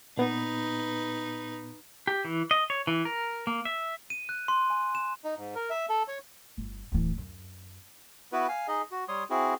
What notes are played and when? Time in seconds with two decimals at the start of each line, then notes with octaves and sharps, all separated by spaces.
0.17 A#2 B3 D#4 B4
2.07 G4
2.25 E3
2.51 D#5
2.70 C#5
2.87 E3
3.05 A#4
3.47 A#3
3.65 E5
4.10 D#7
4.29 F#6
4.48 C6
4.70 G#5
4.95 E7
5.24 D#4
5.37 G#2
5.55 A#4
5.70 E5
5.89 A4
6.08 C#5
6.58 G1
6.92 D1 E3
7.18 F#2
8.32 B3 E4 F#4 B4
8.48 F5 G#5
8.68 D#4 G#4 D#5
8.91 F#4
9.09 G3 C#5 C6 D#6
9.30 C4 E4 F#4 G#4